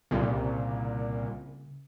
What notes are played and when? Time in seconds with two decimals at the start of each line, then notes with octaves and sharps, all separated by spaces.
0.11 C2 A#2 C#3